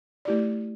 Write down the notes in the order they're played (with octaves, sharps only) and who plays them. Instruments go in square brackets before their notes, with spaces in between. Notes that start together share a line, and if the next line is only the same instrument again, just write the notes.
[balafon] A3 E4 G4 D5